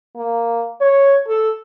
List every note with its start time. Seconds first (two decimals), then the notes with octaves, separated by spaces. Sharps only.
0.16 A#3
0.81 C#5
1.28 A4